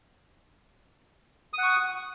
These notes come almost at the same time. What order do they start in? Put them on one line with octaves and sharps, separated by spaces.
D#6 F#5 C#6